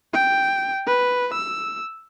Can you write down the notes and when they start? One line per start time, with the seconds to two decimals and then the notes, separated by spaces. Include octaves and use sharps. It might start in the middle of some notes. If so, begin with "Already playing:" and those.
0.14 G5
0.87 B4
1.34 E6